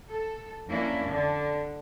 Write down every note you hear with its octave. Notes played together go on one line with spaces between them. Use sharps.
A4
F2 A#3 C#4 D4 E4
D3